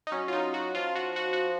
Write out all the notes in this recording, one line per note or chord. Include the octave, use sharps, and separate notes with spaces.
D#4
F#3 C#4
F4
D#4
F#4
F3 F4
F#4
F#4
F#4